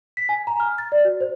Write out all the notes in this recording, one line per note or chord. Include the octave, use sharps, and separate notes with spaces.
B6
G#5
A#5
F6
A6
D5
F#4
C5